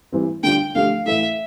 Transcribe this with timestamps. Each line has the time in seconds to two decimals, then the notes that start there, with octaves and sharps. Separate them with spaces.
0.12 E3 G3 C4
0.43 D3 G3 D4 F4 G5
0.75 D3 F3 A3 D4 G4 F5
1.06 A2 E3 A3 E4 E5